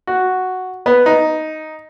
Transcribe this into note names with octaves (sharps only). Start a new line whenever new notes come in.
F#4
B3
D#4